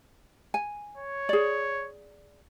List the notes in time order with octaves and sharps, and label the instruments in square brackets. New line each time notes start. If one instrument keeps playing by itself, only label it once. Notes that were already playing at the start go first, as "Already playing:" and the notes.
[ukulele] G#5
[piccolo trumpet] C#5
[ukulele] G#4 D5